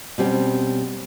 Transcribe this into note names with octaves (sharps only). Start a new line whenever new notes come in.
B2 G3 C4 C#4